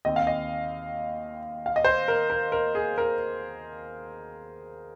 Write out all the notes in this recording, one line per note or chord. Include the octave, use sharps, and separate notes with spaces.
D#2 D#3 C4 D#5
F5
D#5
F5
D#5
C5
A#4
A#4
A#4
G#4
A#4